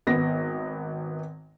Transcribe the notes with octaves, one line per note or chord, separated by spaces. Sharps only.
G#1 B3 A#6